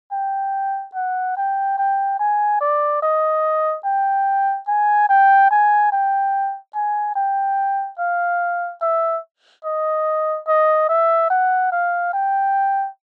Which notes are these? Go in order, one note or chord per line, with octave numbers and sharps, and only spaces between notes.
G5
F#5
G5
G5
G#5
D5
D#5
G5
G#5
G5
G#5
G5
G#5
G5
F5
E5
D#5
D#5
E5
F#5
F5
G5